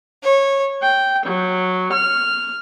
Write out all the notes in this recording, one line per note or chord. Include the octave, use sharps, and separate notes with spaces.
C#5
G5
F#3
F6